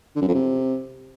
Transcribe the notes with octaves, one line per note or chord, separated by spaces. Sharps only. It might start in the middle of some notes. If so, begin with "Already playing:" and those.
D3
F#2
F2
C3